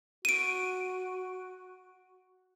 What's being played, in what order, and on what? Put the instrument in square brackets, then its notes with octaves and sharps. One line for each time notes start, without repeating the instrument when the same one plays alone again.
[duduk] F#4 [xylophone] D7 D#7